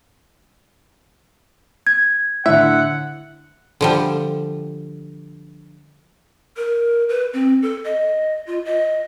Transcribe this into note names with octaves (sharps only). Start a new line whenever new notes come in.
G#6
A2 D3 E5 F#5
D3 F3 G3
A#4
B4
C4
A4
D#5
F4
D#5